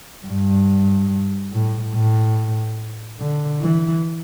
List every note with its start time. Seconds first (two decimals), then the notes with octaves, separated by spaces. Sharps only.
0.26 G2
1.52 A2
1.94 A2
3.20 D3
3.62 E3